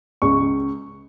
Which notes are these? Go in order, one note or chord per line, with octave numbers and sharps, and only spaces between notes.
C#2 C#6